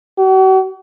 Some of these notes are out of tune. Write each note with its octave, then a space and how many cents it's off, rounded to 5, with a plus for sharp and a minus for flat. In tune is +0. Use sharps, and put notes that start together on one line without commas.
F#4 +45